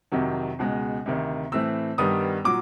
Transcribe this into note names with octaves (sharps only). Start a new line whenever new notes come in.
F2 C3 D#3 F#3
C#2 B2 G#3
D2 C3 D#3
A2 E3 A3 C4 E6
G2 D#3 G3 B3 D#6
A#2 F#3 D6